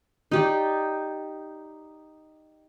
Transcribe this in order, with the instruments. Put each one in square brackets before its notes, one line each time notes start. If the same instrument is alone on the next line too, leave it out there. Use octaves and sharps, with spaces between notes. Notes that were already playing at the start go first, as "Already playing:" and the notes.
[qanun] D#4 G4 D5